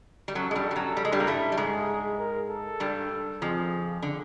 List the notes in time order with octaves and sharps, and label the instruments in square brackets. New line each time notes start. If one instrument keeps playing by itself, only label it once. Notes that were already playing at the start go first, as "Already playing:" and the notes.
[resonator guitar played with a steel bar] G3
[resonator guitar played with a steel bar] F#2 F#3 [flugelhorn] A4
[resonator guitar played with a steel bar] G#3
G2 G3
G3
F#2 F#3
G3
G#3
G2 G3
A#3
A2 A3
G3
[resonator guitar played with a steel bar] G#2 G#3 [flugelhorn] G#4
[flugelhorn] A#4
A4
[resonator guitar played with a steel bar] G2 G3
[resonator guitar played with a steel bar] F2 F3 [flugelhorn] G#4
[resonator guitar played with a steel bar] D3